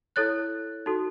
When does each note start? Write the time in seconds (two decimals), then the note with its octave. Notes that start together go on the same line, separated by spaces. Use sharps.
0.16 E4 A4 C#5 F#6 A6
0.86 D#4 F#4 A4